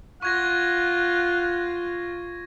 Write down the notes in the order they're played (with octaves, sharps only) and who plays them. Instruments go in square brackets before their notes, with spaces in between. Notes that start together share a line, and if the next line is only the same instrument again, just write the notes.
[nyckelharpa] F4 [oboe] F#5 [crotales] C#6 G#6 A#6